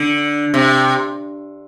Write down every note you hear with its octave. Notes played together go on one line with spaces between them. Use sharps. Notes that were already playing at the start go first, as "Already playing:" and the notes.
Already playing: D3
C3